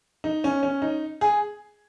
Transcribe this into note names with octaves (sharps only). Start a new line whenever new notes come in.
D#4
C#4
C#4
D#4
G#4